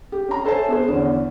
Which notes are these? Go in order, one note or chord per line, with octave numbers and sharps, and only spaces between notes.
G4
C#4 A#5
A4 C5 C#5 E5 G#5 A5
B3 G#4 C5
E2 D3 B3 C#4